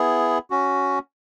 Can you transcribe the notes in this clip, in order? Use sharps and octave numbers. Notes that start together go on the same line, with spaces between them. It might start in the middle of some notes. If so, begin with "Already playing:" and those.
Already playing: B3 E4 G#4
C#4 F#4